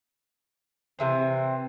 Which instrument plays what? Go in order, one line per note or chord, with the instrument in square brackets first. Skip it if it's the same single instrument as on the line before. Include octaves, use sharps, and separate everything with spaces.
[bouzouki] C3 E3 C4